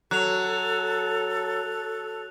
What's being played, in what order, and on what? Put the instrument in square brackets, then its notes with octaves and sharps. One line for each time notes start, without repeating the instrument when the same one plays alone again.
[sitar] F#3 [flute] A4 [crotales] F#6 F7